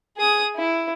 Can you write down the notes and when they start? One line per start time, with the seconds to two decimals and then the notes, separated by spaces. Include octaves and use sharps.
0.17 G#4 D#6
0.56 E4